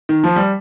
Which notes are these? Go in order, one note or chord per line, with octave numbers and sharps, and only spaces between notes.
D#3
F3
G3